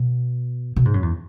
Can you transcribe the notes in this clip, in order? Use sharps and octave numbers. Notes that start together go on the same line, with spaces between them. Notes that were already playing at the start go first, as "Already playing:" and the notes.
Already playing: B2
B2
G#2
F#2
E2